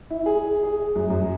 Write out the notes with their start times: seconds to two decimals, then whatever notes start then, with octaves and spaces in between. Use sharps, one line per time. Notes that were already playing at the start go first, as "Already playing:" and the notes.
0.10 E4
0.26 G#4
0.63 G#4
0.95 F#2
1.10 F#2